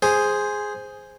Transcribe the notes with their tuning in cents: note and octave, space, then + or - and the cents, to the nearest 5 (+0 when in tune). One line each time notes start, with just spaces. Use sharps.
G#4 +0 C5 +0